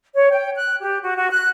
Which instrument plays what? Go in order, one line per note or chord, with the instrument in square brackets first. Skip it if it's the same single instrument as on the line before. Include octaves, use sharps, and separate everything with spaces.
[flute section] C#5
G5
F#6
G4
F#4
F#4
F#6